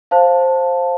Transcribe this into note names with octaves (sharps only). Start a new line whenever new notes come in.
C5 F5 A5